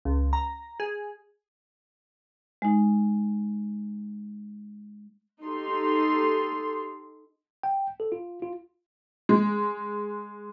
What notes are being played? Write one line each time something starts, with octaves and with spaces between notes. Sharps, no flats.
C#2
A#5
G#4
G#3 D#4
D#4 G4 A4 C6
G5
A4
F4
F4
G#3